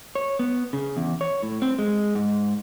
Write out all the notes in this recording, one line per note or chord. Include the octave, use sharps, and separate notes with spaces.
C#5
B3
C#3
E2
C#5
A2
C4
G#3
G#2